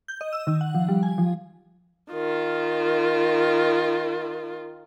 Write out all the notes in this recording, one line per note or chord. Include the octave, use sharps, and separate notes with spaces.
G6
D#5
E6
D#3
F#5
F3
G3
G#5
F3
D#3 F4